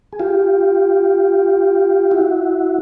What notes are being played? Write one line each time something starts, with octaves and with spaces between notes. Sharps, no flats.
G#4
F4 G4
E4 F#4